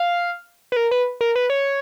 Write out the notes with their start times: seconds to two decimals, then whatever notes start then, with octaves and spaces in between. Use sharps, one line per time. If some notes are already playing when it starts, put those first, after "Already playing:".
Already playing: F5
0.72 B4
0.77 A#4
0.91 B4
1.21 A#4
1.36 B4
1.50 C#5